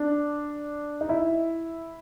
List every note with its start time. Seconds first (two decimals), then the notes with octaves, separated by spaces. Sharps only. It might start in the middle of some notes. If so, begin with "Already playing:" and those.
Already playing: D4
1.01 D#4
1.09 E4